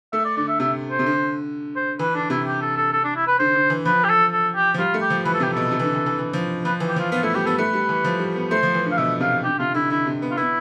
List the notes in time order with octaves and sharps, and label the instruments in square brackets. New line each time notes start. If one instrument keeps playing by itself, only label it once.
[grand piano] A3 [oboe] E5
[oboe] D5
[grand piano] D3 [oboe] D5
[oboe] E5
[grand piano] C3 [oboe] E5
[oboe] C5
[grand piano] C3
D3
[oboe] C5
[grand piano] E3 [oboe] B4
[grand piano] D3 [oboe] D4
[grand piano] C3 [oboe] E4
[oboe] G4
A4
A4
A4
D4
E4
B4
[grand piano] D3 [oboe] C5
[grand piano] D3
E3
[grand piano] F3 [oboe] B4
[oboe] G4
A4
A4
G4
[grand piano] F3
[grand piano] G3 [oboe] F4
[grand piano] A3
[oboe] G4
[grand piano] F3
[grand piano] E3 [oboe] B4
[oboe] A4
[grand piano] C3 [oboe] G4
[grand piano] B2 [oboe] A4
[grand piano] C3
E3
D3
E3
E3
E3
F3
[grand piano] F3 [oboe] B4
[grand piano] E3
[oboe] G4
[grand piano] F3 [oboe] F4
[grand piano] B3 [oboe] F4
[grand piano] A3 [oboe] E4
[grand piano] G3 [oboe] G4
[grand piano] B3 [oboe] A4
[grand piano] A3 [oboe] B4
[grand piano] G3
E3
F3
G3
B3
[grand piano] A3 [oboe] C5
[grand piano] F3
E3
D3
[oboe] F5
[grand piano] B2 [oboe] E5
[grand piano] C3 [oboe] F5
[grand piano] D3 [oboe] G4
[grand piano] C3 [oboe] F4
[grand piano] D3 [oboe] E4
[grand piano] D3 [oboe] E4
[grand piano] C3
B3
[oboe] F4
[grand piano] B3 [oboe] E4